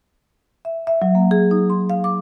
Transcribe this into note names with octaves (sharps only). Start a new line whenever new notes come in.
E5
E5
F#3
A#3
G#4
D#4
C6
F5
D6